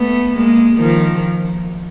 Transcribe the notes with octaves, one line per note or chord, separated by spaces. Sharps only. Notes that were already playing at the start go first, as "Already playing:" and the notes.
Already playing: A3 B3
G#3 A#3
D#3 F3